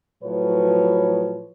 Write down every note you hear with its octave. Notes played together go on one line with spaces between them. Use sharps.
A2 F3 F#3 B4 C#5